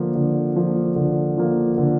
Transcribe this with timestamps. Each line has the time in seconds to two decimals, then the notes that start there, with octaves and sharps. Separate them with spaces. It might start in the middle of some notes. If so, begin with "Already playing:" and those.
Already playing: D3 F3 A#3
0.15 D3
0.56 F3 A#3
0.96 D3
1.37 F3 A#3
1.78 D3